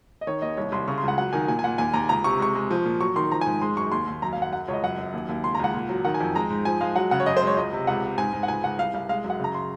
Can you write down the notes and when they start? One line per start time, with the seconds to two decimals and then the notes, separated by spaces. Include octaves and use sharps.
0.21 D#5
0.27 D#3 C#5
0.42 D#2 D#5
0.57 C2 C#5
0.72 C2 C6
0.88 C#3 C#6
0.98 C6
1.03 C#2 F#5
1.17 F#3 F#5
1.33 D#3 G#5
1.48 A#2 G#5
1.59 G#5
1.64 A#2 F#5
1.78 D#2 G#5
1.93 D#2 A#5
2.09 C#2 A#5
2.24 C3 C#6
2.39 G#3 C#6
2.55 G#3
2.71 F3
2.85 A#2
3.01 F#3 C#6
3.16 D#3 C6
3.31 F3 A#5
3.41 G#5
3.46 G#2
3.61 G#3 C6
3.76 F#2 C#6
3.92 D#2 C6
4.07 D#2
4.22 F#2 A#5
4.33 F5
4.37 F#2 F#5
4.53 F#3 F#5
4.68 C#2 C#5
4.73 D#5
4.83 F#2 F#5
4.98 F#2
5.13 D#2
5.29 D#2
5.44 C#2 C6
5.55 A#5
5.59 C#2 F#5
5.74 A#2
5.89 F#3
6.05 D#3 F#5
6.14 G#5
6.20 F2
6.35 G#3 A#5
6.50 G#2
6.65 F3 G#5
6.81 G#3 F5
6.96 F#3 F#5
7.11 C#3 F#5
7.20 C#5
7.26 F#2 D#5
7.37 C5
7.42 G#3
7.47 C#5
7.57 C#2 D#5
7.73 C3
7.87 C#2 F#5
8.03 C3
8.18 G#2 G#5
8.33 G#2
8.43 F#5
8.48 C#2 G#5
8.63 C#2 F#5
8.79 C2 F5
8.94 C2 F5
9.09 G#3 F5
9.24 F#2
9.30 F#5
9.39 C#3 A#5
9.54 C6